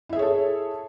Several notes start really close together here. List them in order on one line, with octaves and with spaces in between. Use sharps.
E4 E5 G#4 C#5 A4